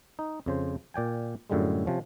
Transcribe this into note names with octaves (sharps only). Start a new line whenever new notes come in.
D#4
F2 C#3 C5
A#2 D5 G5 G#5
F#2 A2 D3 G3 G#3
C3 F3 C#4